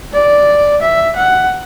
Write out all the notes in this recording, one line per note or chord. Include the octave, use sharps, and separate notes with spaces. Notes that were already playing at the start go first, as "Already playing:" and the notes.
D5
E5
F#5